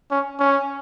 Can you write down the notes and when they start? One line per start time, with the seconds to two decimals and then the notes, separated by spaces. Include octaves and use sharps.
0.11 C#4
0.40 C#4